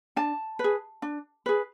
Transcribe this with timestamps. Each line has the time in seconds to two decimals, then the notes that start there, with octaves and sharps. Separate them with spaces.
0.16 D4 A5
0.59 B4
0.64 G#4
1.02 D4
1.46 G#4 B4